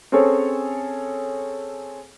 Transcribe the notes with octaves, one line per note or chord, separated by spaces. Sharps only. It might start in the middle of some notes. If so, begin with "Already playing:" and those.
C4 C#4 G#4 A4 C#5